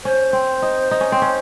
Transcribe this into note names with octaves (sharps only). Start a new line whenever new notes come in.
C#4 C5
C4
D#4
D#4
C#4
C4
C#4